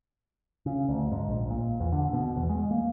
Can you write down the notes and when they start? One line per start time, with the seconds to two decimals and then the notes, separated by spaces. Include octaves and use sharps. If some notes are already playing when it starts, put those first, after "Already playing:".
0.66 C#3
0.88 D2
1.11 G#2
1.28 A#1
1.50 A#2
1.80 E2
1.92 D3
2.13 B2
2.36 E2
2.49 G#3
2.71 A#3